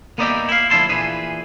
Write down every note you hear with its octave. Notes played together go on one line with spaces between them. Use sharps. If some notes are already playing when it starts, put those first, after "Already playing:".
A#3 B3 D#4 D5 E5 G5
E4 F5
D2 F3 D4 E4 A5 C6
A#2 E3 G#4 B4